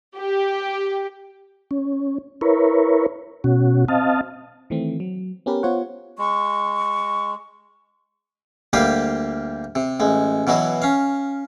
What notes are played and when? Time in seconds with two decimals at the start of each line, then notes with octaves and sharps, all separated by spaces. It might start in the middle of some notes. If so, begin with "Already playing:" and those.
0.15 G4
1.71 C#4
2.41 E4 A#4 B4 C#5
3.44 B2 C#4 F#4
3.88 C4 D#5 F5 A5
4.70 D#3 E3 A3 C4
5.00 F#3
5.46 B3 C#4 G4 A#4 B4
5.63 B3 F4 C5 C#5 F#5
6.19 G#3 C#6
8.73 D2 G3 A#3 G4 F5 D#6
9.75 C3
10.00 A1 G#3
10.47 B2 E3 F#3 F#4
10.82 C#4 F5